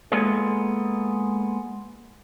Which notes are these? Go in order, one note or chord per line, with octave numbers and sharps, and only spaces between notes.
G#3 A#3 B3 F4 G#4 A4